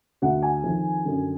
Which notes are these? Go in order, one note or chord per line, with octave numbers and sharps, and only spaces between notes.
D2 D3 F#5
G#5
F2 D#3
F#2 D3